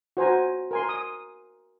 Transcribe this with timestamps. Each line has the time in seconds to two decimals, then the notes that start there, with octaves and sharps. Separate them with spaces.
0.17 F#4 C5 G#5 A#5
0.71 A#4 G#5 C6
0.89 D#6